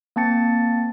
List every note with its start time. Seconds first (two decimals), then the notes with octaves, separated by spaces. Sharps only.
0.16 A#3 C4 A5 A6 C#7